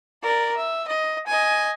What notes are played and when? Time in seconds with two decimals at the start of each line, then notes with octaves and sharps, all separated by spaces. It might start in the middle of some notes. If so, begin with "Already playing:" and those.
0.23 A#4 D5
0.56 E5
0.88 D#5
1.27 D#5 G#5